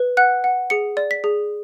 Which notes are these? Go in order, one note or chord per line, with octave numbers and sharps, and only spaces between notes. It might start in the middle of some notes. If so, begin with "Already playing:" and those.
Already playing: B4
F#5 F#6
F#5
G#4 C#7
D5
B6
G#4